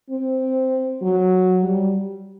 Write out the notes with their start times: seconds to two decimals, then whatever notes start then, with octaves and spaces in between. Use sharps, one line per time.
0.10 C4
1.02 F#3
1.63 G3